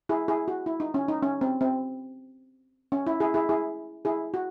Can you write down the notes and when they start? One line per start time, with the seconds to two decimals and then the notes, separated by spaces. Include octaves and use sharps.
0.09 E4 G#4
0.28 E4 G#4
0.48 F#4
0.66 E4
0.80 D#4
0.94 C#4
1.08 D#4
1.23 C#4
1.41 C4
1.61 C4
2.92 C#4
3.07 E4
3.20 E4 G#4
3.34 E4 G#4
3.49 E4 G#4
4.05 E4 G#4
4.34 F#4